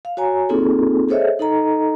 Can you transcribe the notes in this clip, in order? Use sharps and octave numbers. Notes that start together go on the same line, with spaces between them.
F5
F#4 C#5 G#5 A#5
A#3 C4 D#4 F4 G#4 A4
G#4 A4 C5 C#5 D#5 E5
D#4 A4 D#5 A#5